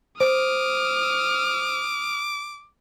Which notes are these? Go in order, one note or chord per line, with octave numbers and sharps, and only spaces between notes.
C5 D6 D#6 F6